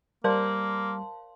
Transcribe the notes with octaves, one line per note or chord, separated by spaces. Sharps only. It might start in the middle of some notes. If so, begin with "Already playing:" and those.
G3 A#3 A#4 C5 D5 F5 A5 C6